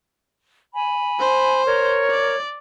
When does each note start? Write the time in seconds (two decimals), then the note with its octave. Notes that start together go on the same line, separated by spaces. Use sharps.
0.74 G#5 B5
1.20 C5
1.66 A#4 C#5
2.11 D5